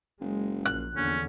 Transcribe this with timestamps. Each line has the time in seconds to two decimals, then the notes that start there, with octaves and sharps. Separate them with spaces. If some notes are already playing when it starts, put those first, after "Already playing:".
0.21 F#1 G#3
0.66 A#1 A#2 F#6
0.96 A#1 E2 D3 C#4